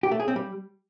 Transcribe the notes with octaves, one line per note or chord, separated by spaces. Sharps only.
G4
A3
G#4
C4
G3